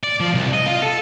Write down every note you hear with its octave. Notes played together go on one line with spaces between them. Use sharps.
D5
F3
C2
D#5
F4
A4